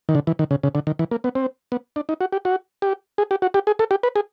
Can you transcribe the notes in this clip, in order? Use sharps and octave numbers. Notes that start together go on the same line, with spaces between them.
D#3
D3
E3
D#3
C#3
C#3
D3
D#3
E3
A#3
B3
C4
B3
D4
D#4
F#4
G4
F#4
G4
G#4
G4
F#4
G4
G#4
A4
G4
B4
G#4